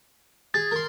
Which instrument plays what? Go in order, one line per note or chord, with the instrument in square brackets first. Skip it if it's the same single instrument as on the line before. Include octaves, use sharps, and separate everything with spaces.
[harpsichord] G#4 [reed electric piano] A6
[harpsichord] A#4 C6